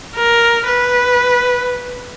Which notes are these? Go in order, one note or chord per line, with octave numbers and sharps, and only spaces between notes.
A#4
B4